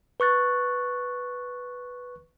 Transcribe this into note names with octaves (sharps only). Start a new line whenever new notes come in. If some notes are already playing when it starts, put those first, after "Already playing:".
B4 C#6 F#6 A6